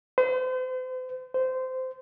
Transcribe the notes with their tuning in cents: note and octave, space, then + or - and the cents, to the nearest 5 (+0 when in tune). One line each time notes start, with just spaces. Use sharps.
C5 -40
C5 -20